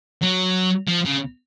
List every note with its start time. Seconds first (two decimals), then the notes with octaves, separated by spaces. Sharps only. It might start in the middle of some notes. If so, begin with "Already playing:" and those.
0.22 F#3
0.88 F3
1.05 C#3